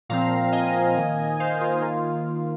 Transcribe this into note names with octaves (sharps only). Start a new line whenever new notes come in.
A#2 F3 C4 F5 A#5
D#5 G#5
D#3 A#3
C5 F5
F4 A#4
D#3 A#3 F4